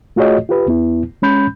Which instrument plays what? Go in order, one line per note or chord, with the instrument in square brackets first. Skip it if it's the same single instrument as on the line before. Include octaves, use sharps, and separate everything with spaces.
[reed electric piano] A3 F4 F#4 G#4 C#5 D#5
F4 G4 B4
E2 B3 E4
G#3 C#4 B5 G6